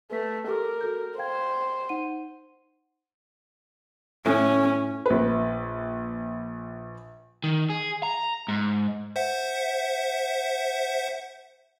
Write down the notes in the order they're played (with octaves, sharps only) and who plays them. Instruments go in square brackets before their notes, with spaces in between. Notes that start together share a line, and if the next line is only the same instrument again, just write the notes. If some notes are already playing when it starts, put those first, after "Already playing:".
[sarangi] A3 [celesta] B4 B6
[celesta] G4 A4 D6 [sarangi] A#4
[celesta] F#4 A4 G6
[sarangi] C5 [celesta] F5 G5 G#6
[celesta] D#4 F#5 D#7
[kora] A2 [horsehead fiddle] C#4
[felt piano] A#1 B4
[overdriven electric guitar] D#3
G#4
A#5
G#2
[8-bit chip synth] C5 E5 F#5